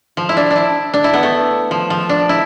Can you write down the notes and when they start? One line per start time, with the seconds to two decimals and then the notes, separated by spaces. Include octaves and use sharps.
0.17 F3
0.29 E4
0.37 D4
0.50 D4
0.56 E4
0.94 D4
1.04 E4
1.14 B3
1.23 A3
1.71 F3
1.90 F3
2.09 D4
2.29 E4